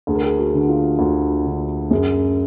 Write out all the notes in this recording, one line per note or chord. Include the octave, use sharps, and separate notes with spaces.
D2 G#4
A#4
G#4
F#4
D3
F4
D2 F#4
D3
F#2 G#4